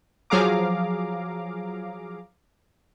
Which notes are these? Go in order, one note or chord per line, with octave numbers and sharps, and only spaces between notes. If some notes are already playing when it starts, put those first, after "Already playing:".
F3 F#3 G#4 F5 A#5 D6